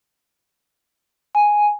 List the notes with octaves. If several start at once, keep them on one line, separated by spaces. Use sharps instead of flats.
G#5